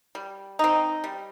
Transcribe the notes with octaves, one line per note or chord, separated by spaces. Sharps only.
G3
C4 D#4
G3